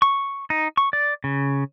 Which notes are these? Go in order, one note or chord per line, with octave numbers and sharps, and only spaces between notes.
C#6
D#4
C#6
D5
C#3